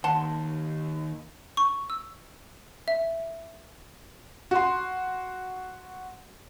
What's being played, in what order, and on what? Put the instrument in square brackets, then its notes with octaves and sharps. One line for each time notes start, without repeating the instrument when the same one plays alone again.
[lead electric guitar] D#2 [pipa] F#5 A5 C6
[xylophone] C#6
E6
E5
[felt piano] F#4 C6